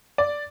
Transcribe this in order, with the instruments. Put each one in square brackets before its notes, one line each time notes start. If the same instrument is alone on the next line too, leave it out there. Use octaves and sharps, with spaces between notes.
[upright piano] D5